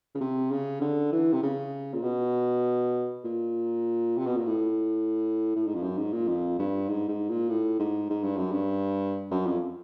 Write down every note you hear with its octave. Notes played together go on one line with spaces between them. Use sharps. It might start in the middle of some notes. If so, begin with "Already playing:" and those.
C#3
C3
C#3
D3
E3
C3
C#3
A#2
B2
A#2
C3
B2
A#2
A2
A2
G#2
F2
F#2
G#2
A#2
F2
G2
G#2
G#2
A#2
A2
G#2
G#2
G2
F#2
G2
F#2
F2